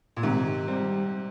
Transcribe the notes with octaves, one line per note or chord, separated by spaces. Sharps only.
A#2
G#2 C3 D#3
G3 C4